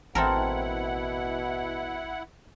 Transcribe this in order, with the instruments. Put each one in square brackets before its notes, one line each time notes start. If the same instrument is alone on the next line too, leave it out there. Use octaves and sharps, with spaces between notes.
[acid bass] A1 [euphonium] B2 [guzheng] C4 A4 A#4 [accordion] E4 F#5